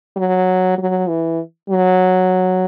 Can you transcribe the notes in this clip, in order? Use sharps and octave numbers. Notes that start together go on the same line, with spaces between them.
F#3
F#3
E3
F#3